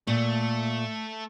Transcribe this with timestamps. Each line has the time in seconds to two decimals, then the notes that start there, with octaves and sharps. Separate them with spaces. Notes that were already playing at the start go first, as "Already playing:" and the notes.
0.07 A#2 A3